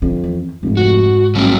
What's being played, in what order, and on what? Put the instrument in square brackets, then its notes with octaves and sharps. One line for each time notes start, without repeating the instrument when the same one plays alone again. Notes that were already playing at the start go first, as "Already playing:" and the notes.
[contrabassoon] F2 [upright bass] D3
[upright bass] E2
[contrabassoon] F1 [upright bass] G#2
[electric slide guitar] F#4
[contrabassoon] A1 [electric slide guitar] F#3 G3 A#3